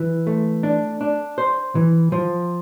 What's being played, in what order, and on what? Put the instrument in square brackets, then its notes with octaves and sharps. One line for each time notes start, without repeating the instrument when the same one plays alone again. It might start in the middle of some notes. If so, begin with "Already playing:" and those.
Already playing: [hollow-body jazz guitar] E3
A3
D4
D4
C5
E3
F3